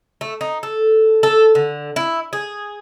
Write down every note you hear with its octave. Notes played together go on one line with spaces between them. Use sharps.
A3
D#4
A4
A4
D3
E4
G#4